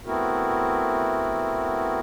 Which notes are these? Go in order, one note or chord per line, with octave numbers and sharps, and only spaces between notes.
A3 B3 C4 E4 F#4 A#4